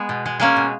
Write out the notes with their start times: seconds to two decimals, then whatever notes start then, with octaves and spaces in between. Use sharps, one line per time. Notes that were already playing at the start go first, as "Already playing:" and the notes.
Already playing: G#3 B3
0.09 B2
0.26 G#3
0.40 G#3 A#3 C#4
0.57 B2